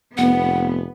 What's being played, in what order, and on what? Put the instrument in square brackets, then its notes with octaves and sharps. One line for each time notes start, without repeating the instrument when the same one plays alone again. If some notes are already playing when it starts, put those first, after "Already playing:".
[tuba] F1 [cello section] B3 [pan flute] F#5